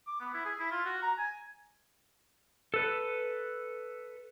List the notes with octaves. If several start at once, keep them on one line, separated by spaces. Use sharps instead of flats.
D6
B3
E4
G#4
E4
F4
F#4
A#5
G#5
A4 B4